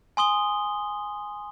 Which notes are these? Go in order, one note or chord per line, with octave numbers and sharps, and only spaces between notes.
G#5 C6 D#6 G7